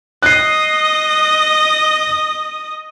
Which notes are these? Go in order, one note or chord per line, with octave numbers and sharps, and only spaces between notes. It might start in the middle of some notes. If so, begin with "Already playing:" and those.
D#5 D#6 F#6 C7